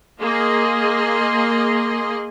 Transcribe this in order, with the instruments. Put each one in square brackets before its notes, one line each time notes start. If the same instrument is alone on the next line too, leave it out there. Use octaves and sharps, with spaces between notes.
[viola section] A#3 G#4 D#5 C6